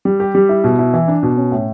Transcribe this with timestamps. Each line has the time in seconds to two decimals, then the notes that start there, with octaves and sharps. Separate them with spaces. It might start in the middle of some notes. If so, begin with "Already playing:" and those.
0.05 G3
0.20 G4
0.35 G3
0.49 E4
0.64 B2
0.79 E4
0.94 E3
1.08 D4
1.23 B2
1.37 C#4
1.52 A2